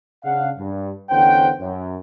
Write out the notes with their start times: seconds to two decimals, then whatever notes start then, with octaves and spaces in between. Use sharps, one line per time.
0.24 C#3 D4 F5 F#5
0.57 G2
1.10 E2 D3 C#4 C5 F#5 G5
1.60 F#2